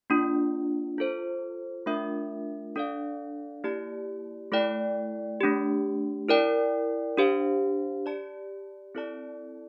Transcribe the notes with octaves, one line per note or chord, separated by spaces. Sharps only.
A#3 D4 F4
F4 A4 C5
A3 D4 F4 A#4 E5
D4 A4 D5 F5
A#3 E4 G4 D5 A5
A3 E4 A4 D5 G5
A3 D4 G4
E4 A#4 D5 G5
D4 G4 C5 F5
G4 D5 A5
C4 E4 A4 D5 A5